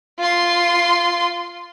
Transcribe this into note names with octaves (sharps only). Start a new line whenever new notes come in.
F4 C6